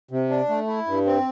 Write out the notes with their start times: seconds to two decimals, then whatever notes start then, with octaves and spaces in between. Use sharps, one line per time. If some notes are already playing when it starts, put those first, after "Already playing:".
0.11 C3
0.30 D4
0.49 A3
0.67 E4
0.87 G2
1.05 C4